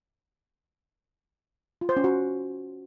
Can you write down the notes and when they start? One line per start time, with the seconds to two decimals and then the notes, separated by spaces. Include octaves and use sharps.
1.81 F4
1.89 C5
1.97 C#4
2.04 F#4